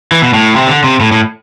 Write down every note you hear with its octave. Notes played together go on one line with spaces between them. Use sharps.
E3
B2
A2
C3
D3
C3
A2
A2